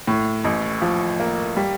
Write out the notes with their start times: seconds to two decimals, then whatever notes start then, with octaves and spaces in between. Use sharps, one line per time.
0.07 A2
0.45 A1
0.82 F3
1.20 A#3
1.56 G3